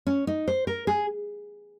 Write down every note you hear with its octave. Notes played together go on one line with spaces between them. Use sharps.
C#4
D#4
C5
A#4
G#4